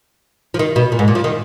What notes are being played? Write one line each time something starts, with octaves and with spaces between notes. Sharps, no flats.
F3
D#3
B2
A#2
G#2
A#2
F3
D#3